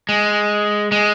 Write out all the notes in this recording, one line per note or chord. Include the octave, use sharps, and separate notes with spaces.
G#3
G#3